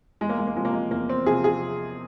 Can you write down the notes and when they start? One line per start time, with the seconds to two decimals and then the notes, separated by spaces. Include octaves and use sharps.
0.21 E2 G#3
0.29 A#3
0.39 G#3
0.47 A#3
0.56 C3 F3 G#3
0.65 A#3
0.73 G#3
0.91 E2 A#3
1.09 C4
1.26 C3 F3 G#4
1.44 G#4